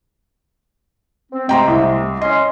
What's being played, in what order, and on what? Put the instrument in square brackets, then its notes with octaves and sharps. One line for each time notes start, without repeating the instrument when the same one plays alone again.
[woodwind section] C4
[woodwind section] C3 G#3 A3 [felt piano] G5 A#5 C6
[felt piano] C2
[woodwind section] C#4 C6 [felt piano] D#5